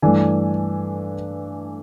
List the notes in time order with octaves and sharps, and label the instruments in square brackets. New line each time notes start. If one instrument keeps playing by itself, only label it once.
[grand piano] G2 E3 A3 D4 G#5